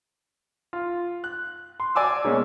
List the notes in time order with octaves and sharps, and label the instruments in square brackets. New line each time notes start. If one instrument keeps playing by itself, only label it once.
[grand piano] F4
F#6
C6
F#4 D5 G#5 D6 E6
B2 G#3 A#3 C#4